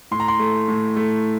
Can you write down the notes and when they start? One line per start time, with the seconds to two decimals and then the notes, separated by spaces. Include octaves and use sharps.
0.11 A2 C6
0.20 A#5
0.28 C6
0.39 A3
0.68 A2
0.96 A3